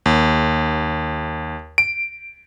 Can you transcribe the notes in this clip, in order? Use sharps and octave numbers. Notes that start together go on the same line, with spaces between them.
D#2
D7